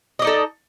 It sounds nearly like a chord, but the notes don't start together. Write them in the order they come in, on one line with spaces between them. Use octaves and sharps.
D#5 D5 D#4 A4